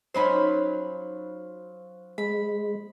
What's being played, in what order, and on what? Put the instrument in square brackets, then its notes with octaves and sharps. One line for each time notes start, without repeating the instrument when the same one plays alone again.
[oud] F#3 C#4 D#4 [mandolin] F4 B5 C6 [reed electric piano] C5
[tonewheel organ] G#3 [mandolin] B5